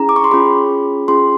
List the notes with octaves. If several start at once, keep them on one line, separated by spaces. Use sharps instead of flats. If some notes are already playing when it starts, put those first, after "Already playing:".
Already playing: C#4 E4 G#4 A#5
D6
C#6
C6
C#4 F4 G#4 B5
C#4 F4 G#4 C6